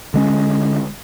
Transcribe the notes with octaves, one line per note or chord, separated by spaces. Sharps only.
D3 G#3 C#4